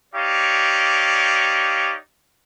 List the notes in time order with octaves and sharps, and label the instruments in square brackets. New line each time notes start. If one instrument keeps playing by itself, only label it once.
[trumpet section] D#4 G4 C#5 D5 F5